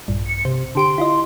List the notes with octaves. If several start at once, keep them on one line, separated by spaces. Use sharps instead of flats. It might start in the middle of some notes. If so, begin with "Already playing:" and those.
A#1 G2
C#7
C3 C5
D3 G4 C6 D7
E4 F4 D#5